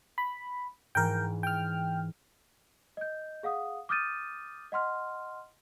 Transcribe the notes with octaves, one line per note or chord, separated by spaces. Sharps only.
B5
G#2 E3 A#4 G5
G5 F6
D#5 G6
G#4 F5 F#5 D#6
D6 D#6 F6 G6 A6 D#7
D#5 F#5 C6 F6